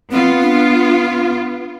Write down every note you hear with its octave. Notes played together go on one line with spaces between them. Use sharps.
B3 C4 F4
D4